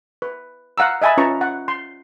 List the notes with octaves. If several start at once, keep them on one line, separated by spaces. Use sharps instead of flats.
B4
F5 F#5 A#5 E6
D#5 E5 G#5 A5 B5
C#4 F4 B4 A5 A#5 C#6
F#5
C6